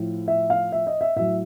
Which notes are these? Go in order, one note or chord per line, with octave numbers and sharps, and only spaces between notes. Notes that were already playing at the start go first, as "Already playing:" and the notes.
Already playing: A2 F3
E5
F5
E5
D#5
E5
A2 F#3 E5